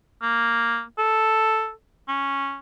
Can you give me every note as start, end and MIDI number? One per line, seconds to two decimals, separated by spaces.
0.22 0.83 58
0.98 1.72 69
2.09 2.59 61